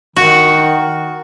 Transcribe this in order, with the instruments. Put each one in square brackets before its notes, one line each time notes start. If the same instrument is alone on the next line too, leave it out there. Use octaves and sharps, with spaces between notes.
[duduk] D#3 [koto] F#4